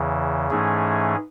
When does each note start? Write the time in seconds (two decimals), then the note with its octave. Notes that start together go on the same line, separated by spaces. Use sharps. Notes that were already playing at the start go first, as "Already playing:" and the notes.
Already playing: E2 C#3 E3
0.50 G#2 E3 A3 C#4 G#4